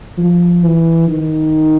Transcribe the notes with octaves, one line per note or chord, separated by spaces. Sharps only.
F3
E3
D#3